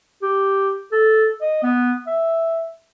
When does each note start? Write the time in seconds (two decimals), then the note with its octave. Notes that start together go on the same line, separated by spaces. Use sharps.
0.22 G4
0.92 A4
1.42 D#5
1.63 B3
2.07 E5